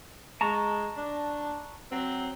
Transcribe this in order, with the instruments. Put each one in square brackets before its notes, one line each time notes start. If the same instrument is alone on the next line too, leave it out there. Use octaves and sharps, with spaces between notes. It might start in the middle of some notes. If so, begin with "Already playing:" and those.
[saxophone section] G#3 [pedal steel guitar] A5 A#5 C#6
[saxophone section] D4
F#3 C4